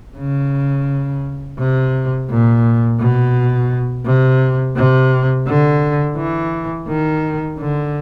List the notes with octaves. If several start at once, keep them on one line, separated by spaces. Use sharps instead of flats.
C#3
C3
A#2
B2
C3
C3
D3
E3
D#3
D3